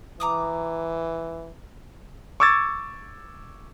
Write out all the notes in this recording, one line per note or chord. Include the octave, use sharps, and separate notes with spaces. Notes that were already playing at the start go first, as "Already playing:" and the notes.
E3 A#5 D6 D#6
C#6 D6 E6 G#6 A6